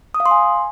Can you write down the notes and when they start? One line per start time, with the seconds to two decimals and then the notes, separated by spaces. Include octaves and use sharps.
0.14 D#6
0.20 F5
0.26 C6
0.31 G#5